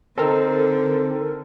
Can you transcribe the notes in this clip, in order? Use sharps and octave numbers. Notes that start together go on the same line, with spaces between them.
D3 C4 D#4 A4 A#4